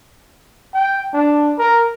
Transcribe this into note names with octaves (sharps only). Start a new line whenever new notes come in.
G5
D4
A#4